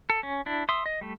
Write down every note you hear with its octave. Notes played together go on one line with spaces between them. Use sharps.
A4
C#4
D4 E4
E5 C6 D#6
D#5
G3 A3